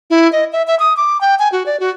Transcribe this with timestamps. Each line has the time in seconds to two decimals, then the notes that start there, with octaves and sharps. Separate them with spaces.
0.10 E4
0.32 D#5
0.53 E5
0.67 E5
0.80 D#6
0.97 D6
1.21 G5
1.39 G#5
1.52 F#4
1.66 D5
1.80 F#4